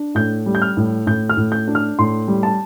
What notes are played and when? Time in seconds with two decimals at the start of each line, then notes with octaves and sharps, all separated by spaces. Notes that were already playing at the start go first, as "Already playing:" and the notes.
Already playing: D4
0.15 A2 G6
0.46 G3
0.55 G6
0.62 F6
0.77 A2
1.06 A2 G6
1.29 F6
1.37 A2
1.52 G6
1.67 D4
1.75 F6
1.99 A2 C6
2.28 G3
2.43 A5